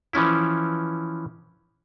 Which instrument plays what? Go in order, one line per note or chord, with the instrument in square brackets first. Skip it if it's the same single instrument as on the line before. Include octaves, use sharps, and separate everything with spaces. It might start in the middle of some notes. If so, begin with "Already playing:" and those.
[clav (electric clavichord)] E3 F3 C#4 E4